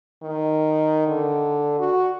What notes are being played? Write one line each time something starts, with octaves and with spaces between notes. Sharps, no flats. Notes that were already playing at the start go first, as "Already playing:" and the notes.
D#3
D3
F#4